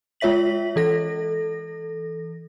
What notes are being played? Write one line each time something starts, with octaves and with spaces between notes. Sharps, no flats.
G#3 F4 C#5 E5 B6 F#7
E3 A4 A#6